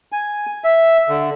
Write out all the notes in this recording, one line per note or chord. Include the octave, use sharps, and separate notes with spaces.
G#5
E5
D3